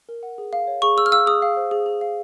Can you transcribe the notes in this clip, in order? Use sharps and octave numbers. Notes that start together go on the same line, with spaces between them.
A#4
F#5
G#4
F5
C#5
G#4 C#6
G#4 E6
F6
F5 E6
G#4 D#6
F5
C5
G#4
G#4
F5